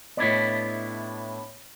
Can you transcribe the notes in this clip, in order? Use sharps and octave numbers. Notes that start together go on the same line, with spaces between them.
A2 B3 D4 E4 D#5